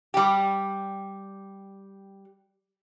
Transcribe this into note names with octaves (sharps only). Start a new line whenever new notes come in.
G3 G4